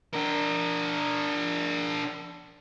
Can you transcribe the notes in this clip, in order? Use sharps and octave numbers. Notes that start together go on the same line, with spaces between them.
D4 A#4